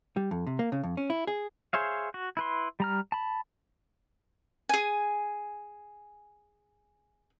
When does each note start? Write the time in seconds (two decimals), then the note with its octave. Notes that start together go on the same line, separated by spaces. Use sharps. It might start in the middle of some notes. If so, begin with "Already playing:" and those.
0.16 G3
0.31 F2
0.47 C3
0.59 A#3
0.72 C#3
0.83 F2
0.97 C#4
1.10 E4
1.27 G#4
1.73 G#4 C5 C#5 E5 F5
2.14 F#4
2.37 E4 B4 C6
2.80 G3 A#5 F6
3.12 A5 B5
4.69 G#4 G#5